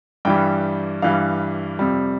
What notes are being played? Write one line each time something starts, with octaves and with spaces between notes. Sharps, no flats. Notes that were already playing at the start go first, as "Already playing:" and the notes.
G2 E3 G3 G5
G2 E3 G3 F5
F2 C3 G3